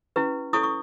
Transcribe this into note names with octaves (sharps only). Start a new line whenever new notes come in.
C#4 E4 G4 B4
E4 A4 C#5 C#6 D#6
C#6